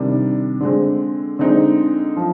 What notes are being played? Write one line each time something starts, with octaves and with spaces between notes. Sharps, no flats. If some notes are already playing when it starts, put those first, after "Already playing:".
Already playing: C3 D#3 G3 D4
D3 G#3 C4
D3 G#3 C4 D#4
F3